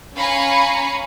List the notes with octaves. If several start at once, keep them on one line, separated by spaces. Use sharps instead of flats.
C#4 F5 G#5 A#5 B5 C#7